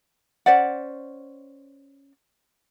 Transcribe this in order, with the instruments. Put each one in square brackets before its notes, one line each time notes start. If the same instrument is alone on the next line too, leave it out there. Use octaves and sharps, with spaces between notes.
[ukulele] C#4 C5 D5 F#5